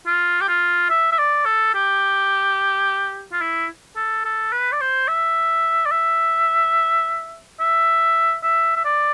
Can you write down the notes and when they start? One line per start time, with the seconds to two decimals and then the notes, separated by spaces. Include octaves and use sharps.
0.07 F4
0.41 G4
0.49 F4
0.90 E5
1.12 E5
1.19 D5
1.46 A4
1.75 G4
3.33 F4
3.42 E4
3.97 A4
4.25 A4
4.53 B4
4.73 D5
4.81 C5
5.08 E5
5.86 D5
5.92 E5
7.60 E5
8.43 E5
8.77 E5
8.85 D5